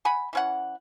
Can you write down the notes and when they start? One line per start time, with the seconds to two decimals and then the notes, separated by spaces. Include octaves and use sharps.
0.05 F#5 G#5 B5
0.33 E3 C#4 F#5